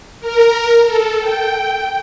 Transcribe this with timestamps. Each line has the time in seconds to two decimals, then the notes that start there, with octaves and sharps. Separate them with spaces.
0.20 A#4
0.84 A4
1.20 G5